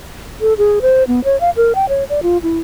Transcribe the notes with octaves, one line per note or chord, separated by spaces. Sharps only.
A4
G#4
C5
B3
C#5
F5
A#4
G5
C#5
D5
F4
E4